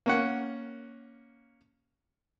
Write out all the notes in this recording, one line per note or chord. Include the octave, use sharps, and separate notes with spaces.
A#3 C#4 F#5